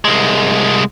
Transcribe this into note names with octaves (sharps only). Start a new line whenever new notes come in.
C2 G#3